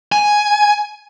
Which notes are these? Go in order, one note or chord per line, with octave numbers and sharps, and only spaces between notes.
G#5